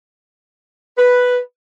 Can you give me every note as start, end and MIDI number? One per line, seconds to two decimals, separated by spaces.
0.98 1.38 71